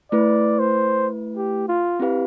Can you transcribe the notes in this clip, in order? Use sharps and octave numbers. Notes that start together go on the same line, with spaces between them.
A3 E4 B4 D5
C5
G4
F4
C4 E4 G4 B4 F5